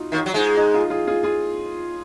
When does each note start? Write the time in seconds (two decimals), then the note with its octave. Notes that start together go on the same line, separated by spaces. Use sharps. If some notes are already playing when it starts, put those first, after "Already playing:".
Already playing: D#4 F4 F#4
0.12 D#2 D#3
0.26 F#3
0.34 G#2 G#3
0.57 D#4
0.74 F4
0.90 F4 G#4
1.07 F4 G#4
1.23 F4 G#4